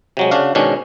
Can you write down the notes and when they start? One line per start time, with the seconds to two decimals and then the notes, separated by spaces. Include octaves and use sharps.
0.17 C3 F#3 G#3
0.31 C#3 D4 F#4 F5
0.55 G#2 B2 D#3 C#4 D4